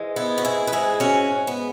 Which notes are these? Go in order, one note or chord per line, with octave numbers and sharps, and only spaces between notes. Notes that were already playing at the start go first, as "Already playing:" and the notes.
Already playing: G#2 E3 G#3
B3 E4
F#4
E4 G#4
B4
G#2 G#3 E4 G#4
C#4 F#4
B3